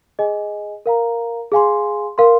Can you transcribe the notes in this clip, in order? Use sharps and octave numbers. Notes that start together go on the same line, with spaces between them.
G#4 D#5 G#5
A#4 F5 A#5
G#4 F5 G#5 C6
A#4 F5 C6